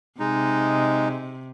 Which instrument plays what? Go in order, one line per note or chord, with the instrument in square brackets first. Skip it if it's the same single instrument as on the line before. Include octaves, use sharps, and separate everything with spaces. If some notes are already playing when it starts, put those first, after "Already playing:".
[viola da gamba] C3 [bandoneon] G#3 D#4